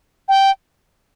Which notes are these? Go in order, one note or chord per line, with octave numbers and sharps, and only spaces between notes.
G5